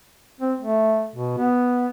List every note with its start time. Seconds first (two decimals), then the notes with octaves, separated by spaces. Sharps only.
0.41 C4
0.59 A3
1.15 B2
1.38 B3